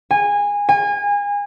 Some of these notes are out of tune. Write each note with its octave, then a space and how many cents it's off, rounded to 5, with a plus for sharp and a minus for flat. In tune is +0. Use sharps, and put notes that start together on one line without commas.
G#5 -20
G#5 -30